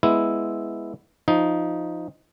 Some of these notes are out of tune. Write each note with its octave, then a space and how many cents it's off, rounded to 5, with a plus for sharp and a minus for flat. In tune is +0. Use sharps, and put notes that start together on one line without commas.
G#3 +0 B3 +0 E4 +0
F3 +0 D#4 +5